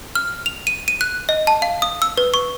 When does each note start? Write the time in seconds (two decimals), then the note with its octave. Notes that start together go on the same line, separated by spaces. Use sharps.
0.15 F6
0.46 F7
0.67 D#7
0.88 D#7
1.01 F#6
1.29 D#5
1.47 A5
1.62 F5
1.82 D#6
2.02 E6
2.17 B4
2.34 C#6